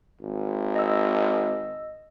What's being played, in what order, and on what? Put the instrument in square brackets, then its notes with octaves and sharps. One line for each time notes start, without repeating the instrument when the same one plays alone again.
[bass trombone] G#1
[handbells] D#5 E6